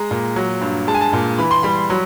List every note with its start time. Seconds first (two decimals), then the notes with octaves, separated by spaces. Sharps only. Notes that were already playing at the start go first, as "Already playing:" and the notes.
Already playing: G#3 A#5
0.11 A#2
0.36 F#3
0.61 G2
0.87 G#3 A5
0.94 G#5
1.01 A5
1.13 A#2
1.38 E3 B5
1.51 C6
1.63 G3 B5
1.90 F#3